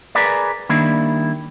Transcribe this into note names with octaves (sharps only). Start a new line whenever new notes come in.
G#4 A#4 B4 D5
D#3 G3 A#3 D4 E4